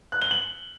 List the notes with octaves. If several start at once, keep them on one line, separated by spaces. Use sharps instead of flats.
F#6
G7
F#7